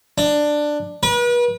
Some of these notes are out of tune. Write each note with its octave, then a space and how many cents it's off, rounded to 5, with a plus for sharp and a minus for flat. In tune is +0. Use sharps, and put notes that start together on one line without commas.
D4 +10
B4 -40